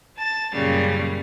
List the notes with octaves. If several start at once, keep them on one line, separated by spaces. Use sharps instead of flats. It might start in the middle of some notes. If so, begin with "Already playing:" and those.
A5 A6
F#2 A#2 C#3 G3 F5